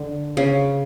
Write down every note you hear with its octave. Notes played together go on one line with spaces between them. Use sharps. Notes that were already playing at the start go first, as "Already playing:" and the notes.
Already playing: D3
C#3